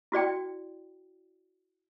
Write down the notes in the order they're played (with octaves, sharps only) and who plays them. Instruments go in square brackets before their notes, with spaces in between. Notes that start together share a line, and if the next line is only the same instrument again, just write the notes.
[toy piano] E4 F#4 D5 G5